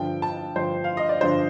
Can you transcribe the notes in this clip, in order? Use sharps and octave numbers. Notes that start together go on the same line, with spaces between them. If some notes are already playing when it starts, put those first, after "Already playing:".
Already playing: G2 D3 F3 G5
A5
G2 D3 F3 C5
F5
D#5
D5
G2 D3 F3 C5